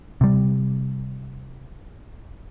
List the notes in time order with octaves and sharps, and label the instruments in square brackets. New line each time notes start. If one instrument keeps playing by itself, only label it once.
[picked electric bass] C3 G3